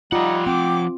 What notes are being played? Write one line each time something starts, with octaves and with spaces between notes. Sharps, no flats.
F3 G3 D#4 F4 F#5
C4 G5 D6